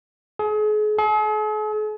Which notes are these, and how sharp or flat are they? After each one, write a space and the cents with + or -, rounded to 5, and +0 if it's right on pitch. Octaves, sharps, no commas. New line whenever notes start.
G#4 +35
G#4 +45